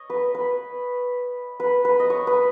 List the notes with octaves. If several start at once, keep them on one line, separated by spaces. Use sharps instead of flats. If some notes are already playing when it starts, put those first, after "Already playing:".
Already playing: C#5 D#5
B4
B4
B4
B4
D#5
C#5
B4